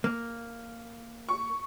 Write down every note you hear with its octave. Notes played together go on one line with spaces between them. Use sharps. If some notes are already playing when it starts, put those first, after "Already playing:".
A#3
C#6